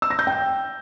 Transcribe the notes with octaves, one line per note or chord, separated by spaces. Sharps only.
E6
A#6
G6
G5